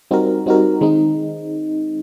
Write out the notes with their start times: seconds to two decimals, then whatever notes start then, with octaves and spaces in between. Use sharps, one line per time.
0.11 G3 C4 D#4 F#4 A#4
0.46 G3 C4 D#4 F#4 A#4
0.81 D#3 G#3 C4 D#4